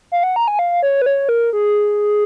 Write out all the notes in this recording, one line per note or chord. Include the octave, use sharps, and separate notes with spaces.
F5
F#5
A#5
G#5
F5
C#5
B4
C#5
A#4
G#4